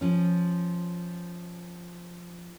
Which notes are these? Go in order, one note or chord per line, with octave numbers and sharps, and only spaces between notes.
F3 C#4